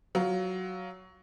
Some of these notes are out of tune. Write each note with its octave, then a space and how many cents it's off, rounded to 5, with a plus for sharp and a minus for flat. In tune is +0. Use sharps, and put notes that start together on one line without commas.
F#3 +10 F4 +5